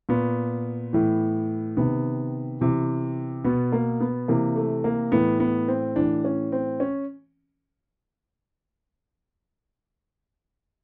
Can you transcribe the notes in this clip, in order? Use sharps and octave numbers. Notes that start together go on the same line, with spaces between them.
A#2 B3
A2 E3
C3 D#3 B3
C3 E3
B2 B3
A#3
B3
C3 E3 A#3
A3
A#3
A2 E3 B3
B3
C4
A2 E3 D4
C#4
C4
C#4